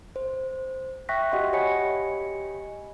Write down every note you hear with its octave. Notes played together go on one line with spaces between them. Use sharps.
C5
E5 G5 C#6 F#6 A#6 B6
F#4 G4 D#5 F#5 G5 C6
G4 C#5 D#5 G#5 B5 C#7